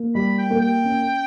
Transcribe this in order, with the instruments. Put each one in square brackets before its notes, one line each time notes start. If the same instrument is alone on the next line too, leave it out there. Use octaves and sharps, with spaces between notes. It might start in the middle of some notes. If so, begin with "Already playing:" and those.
Already playing: [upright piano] A#3
[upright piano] G3 [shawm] B5
[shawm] G5
[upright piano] A#3
[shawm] G5
[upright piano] C#4